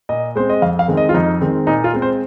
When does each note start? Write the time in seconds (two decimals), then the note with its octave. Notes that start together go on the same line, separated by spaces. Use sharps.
0.09 A#2 D#5
0.36 G#3 C4 C5
0.49 D#5
0.62 F2 F5
0.79 F5
0.88 D#3 G#3 C4
0.97 D#5
1.09 F4
1.14 F2 D#4
1.41 D#3 G#3 C4
1.67 A#2 D#4
1.84 F4
1.93 G#3 C4
2.02 C5